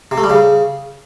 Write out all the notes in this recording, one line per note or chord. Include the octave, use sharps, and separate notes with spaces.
C3
A3
G3
C#3